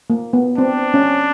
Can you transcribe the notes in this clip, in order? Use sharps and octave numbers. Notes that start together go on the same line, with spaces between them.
A#3
B3
C4 D4
C#4